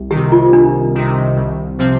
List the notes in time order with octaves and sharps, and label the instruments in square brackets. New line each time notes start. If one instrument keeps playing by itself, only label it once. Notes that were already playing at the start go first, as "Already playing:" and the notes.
Already playing: [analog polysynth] C2
[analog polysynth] C3 D#3 [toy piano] G4
[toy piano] F4
[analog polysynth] C2 [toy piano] D4
[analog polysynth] C3 D#3
C2
C3 F3 C4